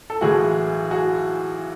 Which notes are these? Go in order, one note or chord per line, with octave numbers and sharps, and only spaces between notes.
A4
B1 A2 E3 G#3 F#4 G#4
F#4 G#4